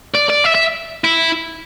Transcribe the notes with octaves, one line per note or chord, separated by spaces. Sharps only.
D5
D5
E5
E5
E4